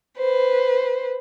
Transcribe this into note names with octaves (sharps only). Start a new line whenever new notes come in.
B4 C5